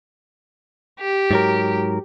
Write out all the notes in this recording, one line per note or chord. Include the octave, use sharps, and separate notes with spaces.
G4
G#2 F#3 A#4